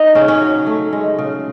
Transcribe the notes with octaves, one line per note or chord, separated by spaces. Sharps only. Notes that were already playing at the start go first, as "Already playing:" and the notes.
Already playing: D#4
C#3 C#4
C#4
F#3
A3
G#3
C#3